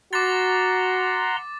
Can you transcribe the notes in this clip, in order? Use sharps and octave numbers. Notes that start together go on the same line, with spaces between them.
F#4 F#5 A#5 C6 D6 A6